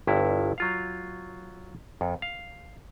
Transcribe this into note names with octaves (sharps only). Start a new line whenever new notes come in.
G1 G2 E4
F#3 F4 F5
F2
F5